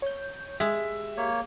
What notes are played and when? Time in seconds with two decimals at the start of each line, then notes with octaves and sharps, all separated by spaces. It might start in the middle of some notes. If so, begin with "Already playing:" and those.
0.02 C#5 G6
0.60 G#3 G4 E5
1.17 A#3 C#5